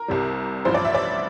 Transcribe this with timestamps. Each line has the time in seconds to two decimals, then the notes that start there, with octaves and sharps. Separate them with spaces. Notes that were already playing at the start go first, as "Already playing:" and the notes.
Already playing: A#4
0.08 C2 C3 G3
0.65 A1 G2 F3 C5
0.74 D5
0.85 E5
0.94 D5